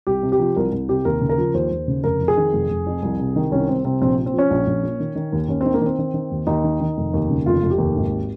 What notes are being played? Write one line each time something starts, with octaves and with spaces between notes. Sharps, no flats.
C2 G4
C3
G4
F3
C2 A#4
C2
C3 G4
D#2 A#4
C#3
A#4
F3
D#2 C5
D#2
C#3
F1 A#4
F2
G#4
D#3
F1
F1
F2
C2
C3
D#3
C2 C#4
C2 C4
C3 C4
A#1 C4
A#2
C4
F3 C#4
A#1
A#1
A#2
D#3
D#3
D#2
D#2 C#4
C4
D#3
A#3
D#3 C4
D#3
D#3
D#2
D#2 D#4
D#3
D#3
F1
D#2
C#3
F1 F4
F1
G4
D#2
G#1